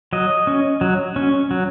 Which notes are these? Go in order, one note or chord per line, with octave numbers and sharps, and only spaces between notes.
F#3 D#5
C#4
F#3
C#4
F#3